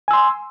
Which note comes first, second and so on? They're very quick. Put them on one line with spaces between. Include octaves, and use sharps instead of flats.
G#5 E6 C6